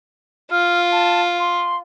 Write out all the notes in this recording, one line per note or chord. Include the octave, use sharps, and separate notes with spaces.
F4 F6
A5
C6